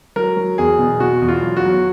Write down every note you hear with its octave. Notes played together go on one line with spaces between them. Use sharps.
F#3 A#4
F#3
E2 G#4
B2
B2 F#4
E2
F4
F#3
F#4
F#3